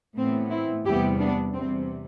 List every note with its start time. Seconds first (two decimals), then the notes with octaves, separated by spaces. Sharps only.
0.16 A2 E3 B3 C4
0.50 C4 E4
0.85 E2 C3 G3 B3 E4 G4
1.19 B3 D4
1.53 E2 C3 G3 C4